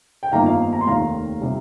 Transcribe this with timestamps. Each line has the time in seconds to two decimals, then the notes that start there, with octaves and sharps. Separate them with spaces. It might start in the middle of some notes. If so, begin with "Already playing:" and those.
0.23 G5
0.32 G1 F2 D#3 A#3 D#4 F5 A#5
0.45 F5 A#5
0.73 A#5
0.81 C6
0.86 F1 D#2 D#3 F5 A#5
1.40 C3 G3